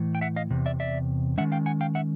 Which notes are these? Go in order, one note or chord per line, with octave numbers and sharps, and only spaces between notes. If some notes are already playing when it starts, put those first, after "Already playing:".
Already playing: A2 E3
G5
E5 F#5
D#5 F5
E2 C3
D5 E5
D5 E5
D#3 G#3 C#4 E5 F#5
F5 G5
F#5 G#5
F5 G5
E5 F#5